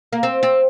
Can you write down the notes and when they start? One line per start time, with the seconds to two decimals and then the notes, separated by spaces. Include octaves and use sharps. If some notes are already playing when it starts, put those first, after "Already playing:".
0.13 A#3
0.23 C4
0.43 C4